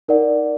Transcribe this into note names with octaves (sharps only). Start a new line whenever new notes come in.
D#4 A#4 D5 F#5